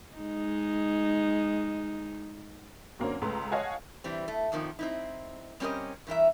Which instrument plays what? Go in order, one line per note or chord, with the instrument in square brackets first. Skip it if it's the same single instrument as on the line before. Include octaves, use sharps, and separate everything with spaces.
[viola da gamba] G#3 D#4
[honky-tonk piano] F#2 D3 F#3 A#3 C4 C#4
C#2 C#3 A3 B4 A#5 C6
C#5 D#5 F5 F#5 G#5 A5
[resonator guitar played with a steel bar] E3 G3 C4
A3
F2 A#2 D#3 F3
C4 D#4 E4
G3 C4 C#4 G4 A#4 D#5
G2 E3 A#4 E5